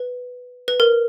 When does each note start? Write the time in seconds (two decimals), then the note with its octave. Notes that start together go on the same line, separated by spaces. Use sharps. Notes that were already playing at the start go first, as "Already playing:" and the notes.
Already playing: B4
0.68 B4
0.80 A#4